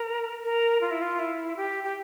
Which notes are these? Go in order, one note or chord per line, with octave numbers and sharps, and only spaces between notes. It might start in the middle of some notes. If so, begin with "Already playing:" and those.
Already playing: A#4
A#4
F4
E4
F4
E4
G4
G4